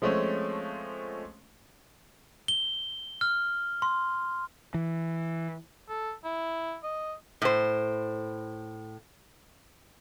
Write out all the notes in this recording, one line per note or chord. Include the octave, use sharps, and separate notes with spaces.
F3 G#3 A3 C4 C#4
G7
F6
C6
E3
A4
E4
D#5
A2 C5